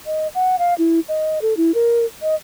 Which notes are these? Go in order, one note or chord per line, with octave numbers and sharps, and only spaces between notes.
D#5
F#5
F5
E4
D#5
A4
E4
A#4
D#5